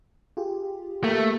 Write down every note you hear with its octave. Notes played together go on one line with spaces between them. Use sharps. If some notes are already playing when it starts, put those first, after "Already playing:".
F4 G4 G#4
A3 A#3